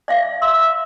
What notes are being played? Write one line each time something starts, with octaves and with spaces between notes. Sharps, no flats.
D5 E5 F5
E5 C6